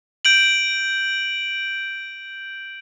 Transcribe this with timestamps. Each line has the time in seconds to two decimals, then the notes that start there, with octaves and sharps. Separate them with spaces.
0.25 G6 D7 F#7